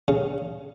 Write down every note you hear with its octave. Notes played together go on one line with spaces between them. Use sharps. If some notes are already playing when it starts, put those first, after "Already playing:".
C#3